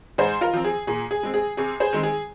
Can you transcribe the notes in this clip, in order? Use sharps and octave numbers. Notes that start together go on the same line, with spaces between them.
G#2 G#4 C5
F4 A#4
F3 C4
G#4
A#2 G#4
G#4
G#3 C4
G#4
C3 G#4
G#4 C5
D#3 G#3 C4
G#4